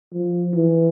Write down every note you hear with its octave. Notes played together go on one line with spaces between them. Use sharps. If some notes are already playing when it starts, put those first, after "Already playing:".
F3
E3